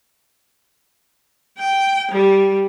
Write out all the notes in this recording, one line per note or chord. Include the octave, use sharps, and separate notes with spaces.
G5
G3